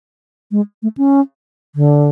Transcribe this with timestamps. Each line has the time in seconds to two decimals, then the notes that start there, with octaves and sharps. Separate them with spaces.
0.51 G#3
0.83 A3
0.98 C#4
1.75 D3